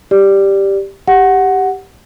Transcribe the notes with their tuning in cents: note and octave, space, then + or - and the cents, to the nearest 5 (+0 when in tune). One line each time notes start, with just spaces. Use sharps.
G4 +0 D5 +0
G4 +0 F#5 +0